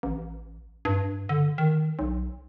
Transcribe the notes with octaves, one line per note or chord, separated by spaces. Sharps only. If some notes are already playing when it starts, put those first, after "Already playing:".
A1
G2
D3
D#3
B1